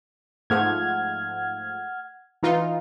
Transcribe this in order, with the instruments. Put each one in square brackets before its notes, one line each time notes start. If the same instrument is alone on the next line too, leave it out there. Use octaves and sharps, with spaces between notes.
[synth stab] G#2 F3 A3 [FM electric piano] F#5 F6 G#6
[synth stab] E3 D#4 F4